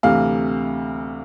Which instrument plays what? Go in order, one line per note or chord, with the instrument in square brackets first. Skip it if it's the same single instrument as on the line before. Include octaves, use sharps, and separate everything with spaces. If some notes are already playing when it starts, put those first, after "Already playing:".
[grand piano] D2 C3 E3 F5